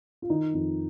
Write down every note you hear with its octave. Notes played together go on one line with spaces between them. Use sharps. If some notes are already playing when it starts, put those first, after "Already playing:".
F4
D#3 D#4
F2